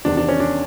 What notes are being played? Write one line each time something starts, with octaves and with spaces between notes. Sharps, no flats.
E2 C3 D#3 D4
D4
C#4
D4